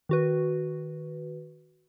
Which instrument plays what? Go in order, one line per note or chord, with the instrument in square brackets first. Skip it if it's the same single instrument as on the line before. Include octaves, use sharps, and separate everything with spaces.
[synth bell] D#3 F#4 B4